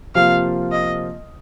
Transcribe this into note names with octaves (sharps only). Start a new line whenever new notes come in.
C3 F3 A#3 F4 F5
D#5